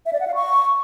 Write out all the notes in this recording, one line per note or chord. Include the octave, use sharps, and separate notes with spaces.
E5
D5
F#5
F5
C#6